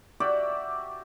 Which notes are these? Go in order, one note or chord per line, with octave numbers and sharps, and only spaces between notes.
F#4 G4 D5 E5